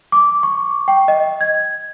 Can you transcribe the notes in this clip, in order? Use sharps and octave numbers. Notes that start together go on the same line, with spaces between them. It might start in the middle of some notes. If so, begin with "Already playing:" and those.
D6
C#6
G5
D#5
G#6